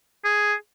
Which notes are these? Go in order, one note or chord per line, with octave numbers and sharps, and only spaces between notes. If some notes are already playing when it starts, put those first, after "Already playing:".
G#4